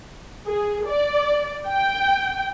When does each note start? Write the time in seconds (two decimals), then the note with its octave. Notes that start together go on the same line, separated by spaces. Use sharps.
0.46 G#4
0.87 D5
1.67 G5